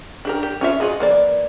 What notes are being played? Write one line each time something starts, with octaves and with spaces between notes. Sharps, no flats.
D4 G4 A#4
G4
C#4 F4 E5
F4 F#4 G#4 D#5
E3 A#3 D5